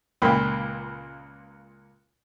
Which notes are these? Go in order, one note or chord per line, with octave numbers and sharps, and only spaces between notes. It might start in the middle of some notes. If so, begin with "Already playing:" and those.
C#2 A#2 A#3 G5 B5